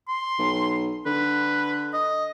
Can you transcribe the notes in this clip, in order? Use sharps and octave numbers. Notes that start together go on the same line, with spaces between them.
C6
B1
D3 B4
D#5